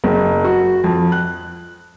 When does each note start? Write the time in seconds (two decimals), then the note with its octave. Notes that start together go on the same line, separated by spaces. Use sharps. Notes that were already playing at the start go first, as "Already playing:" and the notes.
0.04 F#1
0.44 F#4
0.84 F2
1.12 F#6